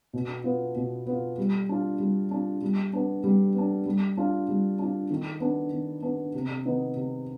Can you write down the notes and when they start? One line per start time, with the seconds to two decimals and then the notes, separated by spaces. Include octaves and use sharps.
0.13 B2
0.44 B3 F4
0.76 B2
1.06 B3 F4
1.38 G3
1.69 D4 F4
2.00 G3
2.31 D4 F4
2.62 G3
2.93 B3 D4
3.24 G3
3.54 B3 D4
3.86 G3
4.17 D4 F4
4.48 G3
4.79 D4 F4
5.10 D#3
5.40 B3 D4
5.72 D#3
6.03 B3 D4
6.34 C3
6.65 D#3 B3 D#4
6.96 C3